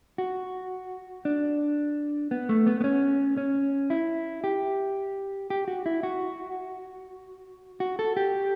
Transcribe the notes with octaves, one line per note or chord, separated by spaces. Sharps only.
F#4
D4
B3
A3
B3
B3
C#4
C#4
E4
G4
G4
F#4
E4
F#4
F#4
A4
G4